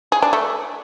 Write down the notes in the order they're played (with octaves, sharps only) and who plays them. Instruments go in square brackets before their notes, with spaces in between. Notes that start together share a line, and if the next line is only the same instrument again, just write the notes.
[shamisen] G#4
D4
A3